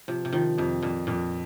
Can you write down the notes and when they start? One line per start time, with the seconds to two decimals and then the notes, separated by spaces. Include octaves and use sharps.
0.08 C3 F3
0.25 C3
0.33 D#3 F3
0.58 F2 C3
0.83 F2 A#2
1.07 F2 A#2